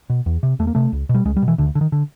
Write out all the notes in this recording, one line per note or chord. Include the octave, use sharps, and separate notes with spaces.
B2
E2
C3
E2 A3
A#3
C3 A3
C#2
B2
G3
C#2 G#3
G3
B2
E3
D2 D3
D3
D#3
D3